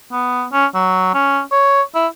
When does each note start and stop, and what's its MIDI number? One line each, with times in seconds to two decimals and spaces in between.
0.12 0.46 59
0.52 0.66 61
0.74 1.11 54
1.14 1.41 61
1.51 1.82 73
1.95 2.07 64